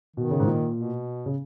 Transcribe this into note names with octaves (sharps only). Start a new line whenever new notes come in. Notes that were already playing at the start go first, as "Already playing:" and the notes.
B2 D#3
C#3
G#2
A#2
B2
C#3